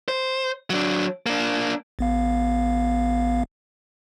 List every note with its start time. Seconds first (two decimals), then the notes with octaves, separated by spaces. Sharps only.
0.08 C5
0.70 F#3 D4
1.26 A#3 D4
1.99 A1 B3 F5